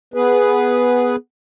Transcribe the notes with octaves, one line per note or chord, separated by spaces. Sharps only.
B3 G#4 B4